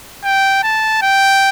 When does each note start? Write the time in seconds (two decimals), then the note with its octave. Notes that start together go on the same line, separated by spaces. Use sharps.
0.24 G5
0.63 A5
1.02 G5